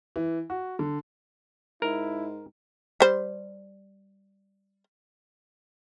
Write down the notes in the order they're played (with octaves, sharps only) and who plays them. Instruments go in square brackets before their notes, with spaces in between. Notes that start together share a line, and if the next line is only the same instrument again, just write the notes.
[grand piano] E3
F#4
D3
[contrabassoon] G#2 [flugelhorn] E4 [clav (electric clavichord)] A#4
[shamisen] G3 C5